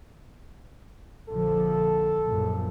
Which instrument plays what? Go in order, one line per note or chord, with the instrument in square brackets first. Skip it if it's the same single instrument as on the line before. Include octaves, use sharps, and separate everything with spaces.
[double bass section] A#1 D3 F3 [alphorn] A4
[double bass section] A#1 F#2